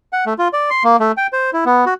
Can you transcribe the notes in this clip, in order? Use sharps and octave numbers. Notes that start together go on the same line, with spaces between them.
F#5
A3
F4
D5
C6
A#3
A3
G5
C5
E4
B3
F#4